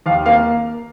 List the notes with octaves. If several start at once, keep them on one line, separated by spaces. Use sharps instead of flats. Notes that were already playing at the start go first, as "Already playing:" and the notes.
D#2 F5
A#3 F5